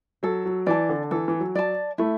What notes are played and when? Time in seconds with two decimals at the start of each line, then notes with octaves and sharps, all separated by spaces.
0.23 F#3 A4
0.45 F#3
0.66 E3 D5 A5
0.89 D3
1.11 E3 A4
1.28 E3
1.40 F#3
1.55 D5 A5
1.98 A3 E4